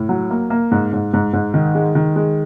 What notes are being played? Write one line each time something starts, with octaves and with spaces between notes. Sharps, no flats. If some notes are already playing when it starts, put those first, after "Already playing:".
Already playing: A2
F#3
A#3
A#3
G#2
G#2
G#2
G#2
D#3
G#3
D#3
G#3